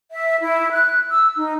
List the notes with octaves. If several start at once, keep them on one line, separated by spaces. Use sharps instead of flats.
E5
E4
F#6
E6
D#4